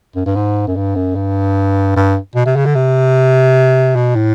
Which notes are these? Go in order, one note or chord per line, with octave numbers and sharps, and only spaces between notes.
F#2
G2
G#2
F#2
G2
F#2
G2
G2
B2
C3
C#3
D3
C3
B2
A2